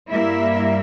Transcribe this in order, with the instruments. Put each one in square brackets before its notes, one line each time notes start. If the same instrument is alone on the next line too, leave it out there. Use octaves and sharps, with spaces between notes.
[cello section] G2 G3 A#3 E4 E5